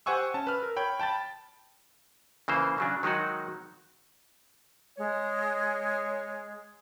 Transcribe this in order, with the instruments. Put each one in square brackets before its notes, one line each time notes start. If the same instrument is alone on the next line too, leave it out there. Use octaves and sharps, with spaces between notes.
[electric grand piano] G4 C5 F#5 G#5 C#6 E6
C#4 A5
B4 F6
A#4
C#5 G5 B5
G5 A5 B5 A6
[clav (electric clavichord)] C#3 E3 A#3 C5
C#3 F#3 D4
D#3 F#3 G#3 D#4 F#4
[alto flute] G#3 [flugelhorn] C#5